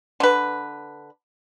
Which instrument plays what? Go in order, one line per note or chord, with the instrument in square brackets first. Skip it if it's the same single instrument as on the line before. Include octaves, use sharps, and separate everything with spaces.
[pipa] D3 B4